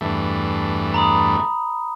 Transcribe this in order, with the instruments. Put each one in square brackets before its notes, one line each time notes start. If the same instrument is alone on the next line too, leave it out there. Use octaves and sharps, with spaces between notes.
[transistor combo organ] E2 G2 A3
[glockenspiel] A#5 B5 D#6